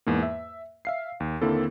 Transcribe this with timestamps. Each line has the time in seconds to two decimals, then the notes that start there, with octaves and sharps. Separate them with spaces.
0.06 E2 G#2 A#3
0.23 E5
0.85 E5 F5 C7
1.20 D#2
1.42 D#2 D3 A#3 C4 E4 A4